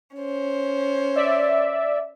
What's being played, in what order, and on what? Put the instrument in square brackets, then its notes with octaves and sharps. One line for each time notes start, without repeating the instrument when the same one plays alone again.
[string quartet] C#4 C5
[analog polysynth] D5 E5